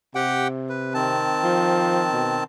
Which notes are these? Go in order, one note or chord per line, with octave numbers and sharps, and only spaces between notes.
C3 G4 F#5 G5
B4
D#3 C4 A5
F3
B2